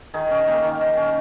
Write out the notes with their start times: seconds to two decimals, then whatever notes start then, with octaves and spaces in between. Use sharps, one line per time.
0.14 D#3 G#4
0.31 C#4
0.47 A#3 G4
0.64 D#3
0.81 D#3
0.97 C#4